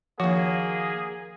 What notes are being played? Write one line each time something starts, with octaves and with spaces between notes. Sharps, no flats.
D#2 F3 A#3 F#4 G#4